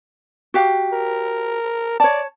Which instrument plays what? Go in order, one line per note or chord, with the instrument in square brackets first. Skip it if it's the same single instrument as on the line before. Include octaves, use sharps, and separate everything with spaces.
[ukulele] F#4 G4 F5
[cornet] A#4
[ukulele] C#5 A5 [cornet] D5